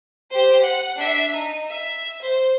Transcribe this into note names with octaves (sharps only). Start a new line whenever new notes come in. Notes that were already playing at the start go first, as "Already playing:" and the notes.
G4 C5
F#5
D4 E5
D#4
E5
C5